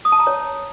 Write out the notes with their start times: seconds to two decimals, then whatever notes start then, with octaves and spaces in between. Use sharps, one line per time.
0.05 D#6
0.12 A5
0.20 A#5
0.27 C#5